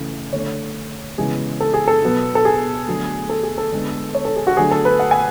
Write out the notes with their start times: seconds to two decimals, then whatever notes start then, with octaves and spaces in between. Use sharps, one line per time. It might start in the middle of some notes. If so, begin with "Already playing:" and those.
Already playing: C#3 E3 A3
0.33 D3 A3 C#5
1.18 C#3 E3 G#3 B3 G#4
1.61 A4
1.74 G#4
1.88 A4
2.02 B2 F#3 B3
2.35 A4
2.45 G#4
2.88 D3 F#3 A3
3.30 A4
3.43 G#4
3.58 A4
3.72 D3 G#3 B3
4.15 C#5
4.25 A4
4.36 G#4
4.47 F#4
4.57 D3 F#3 A3 G#4
4.71 A4
4.85 B4
4.99 F#5
5.11 G#5